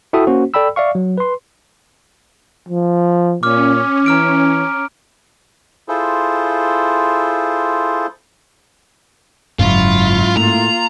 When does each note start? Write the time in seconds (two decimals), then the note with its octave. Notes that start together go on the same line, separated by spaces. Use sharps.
0.13 E4 F#4 A4 E5 G5 D#6
0.27 A#3 C#4 F#4 C5
0.54 A4 D5 G5 B5 E6
0.76 D5 E5 F5 C#6
0.95 F#3
1.18 B4 C6
2.69 F3
3.43 A#2 C#4 D6 F6
4.06 E3 A#5 F6 D7
5.89 E4 F4 G#4 A4 C5
9.59 F#1 G#2 F#3 C#4 E4 F4
10.37 A2 A#3 F4 A#5